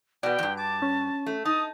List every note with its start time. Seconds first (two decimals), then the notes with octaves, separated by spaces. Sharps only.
0.23 B2 B3 D5 G5
0.39 E2 G2
0.57 A5 D6
0.82 C#4
1.26 A3
1.45 D#4 A5 D#6